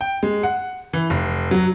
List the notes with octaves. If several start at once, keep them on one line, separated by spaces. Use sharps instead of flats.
G5
G#3
F#5
E3
F1
F#3